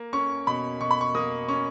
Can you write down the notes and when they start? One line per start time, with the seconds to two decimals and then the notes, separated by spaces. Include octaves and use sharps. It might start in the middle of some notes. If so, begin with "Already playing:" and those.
Already playing: A#3
0.13 C#4 C#6
0.47 B2 B5
0.80 B2 C#6
0.91 B5
1.01 C#6
1.15 A#3 D#6
1.48 C#4 C#6